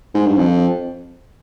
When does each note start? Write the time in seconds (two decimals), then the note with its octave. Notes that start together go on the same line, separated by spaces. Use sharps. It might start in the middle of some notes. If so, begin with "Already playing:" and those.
0.14 G#2
0.26 G2
0.38 F2